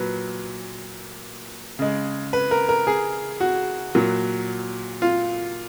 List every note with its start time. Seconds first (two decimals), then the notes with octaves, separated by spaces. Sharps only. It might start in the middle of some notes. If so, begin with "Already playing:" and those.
Already playing: A#2 F#3 B4
1.79 C#3 G#3
2.33 B4
2.51 A#4
2.69 A#4
2.87 G#4
3.40 F#4
3.95 A#2 F#3
5.02 F4